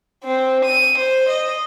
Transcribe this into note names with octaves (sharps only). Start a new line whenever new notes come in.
C4
D#7
C5
D#5